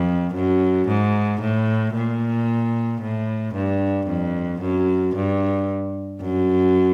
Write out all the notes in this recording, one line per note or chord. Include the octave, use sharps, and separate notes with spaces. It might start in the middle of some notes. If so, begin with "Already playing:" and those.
Already playing: F2
F#2
G#2
A2
A#2
A2
G2
F2
F#2
G2
F#2